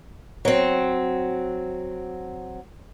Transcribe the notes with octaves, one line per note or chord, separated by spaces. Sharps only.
F#3 C4